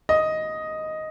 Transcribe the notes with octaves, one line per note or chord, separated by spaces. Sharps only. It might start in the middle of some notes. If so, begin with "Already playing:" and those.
D#5